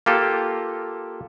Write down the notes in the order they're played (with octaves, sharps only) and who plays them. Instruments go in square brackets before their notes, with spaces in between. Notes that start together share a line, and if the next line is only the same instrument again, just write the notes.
[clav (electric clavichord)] A#3 F4 G4 A4